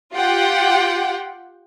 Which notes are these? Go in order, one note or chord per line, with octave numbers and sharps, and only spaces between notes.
F4 G4 F#5 G5